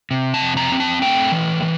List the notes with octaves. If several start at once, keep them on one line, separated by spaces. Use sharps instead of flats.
C3
A5
F2
A#5
C4
A5
A3 G5
E3
E3